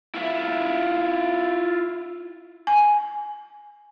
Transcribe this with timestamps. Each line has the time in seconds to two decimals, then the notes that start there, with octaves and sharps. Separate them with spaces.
0.14 E4 F4 C5 E5
2.67 G#5